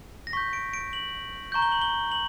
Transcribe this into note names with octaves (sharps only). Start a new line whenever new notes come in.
A#6
C#6 G6 B6
D7
D7
F#7
A#5 C#6 G6
G7
F#7
G7
F#7